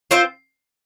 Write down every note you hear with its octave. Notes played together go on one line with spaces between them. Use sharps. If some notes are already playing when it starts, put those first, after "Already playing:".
C4 F4 C5